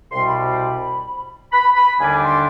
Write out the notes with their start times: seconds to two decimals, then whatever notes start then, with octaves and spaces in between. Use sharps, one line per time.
0.12 C2 B2 G3 C4 C6
0.27 B5
0.43 B5
1.52 B5
1.76 B5
2.00 D#2 D3 G3 D4 G#5
2.23 C6